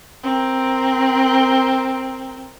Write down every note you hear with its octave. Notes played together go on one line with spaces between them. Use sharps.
C4 A#4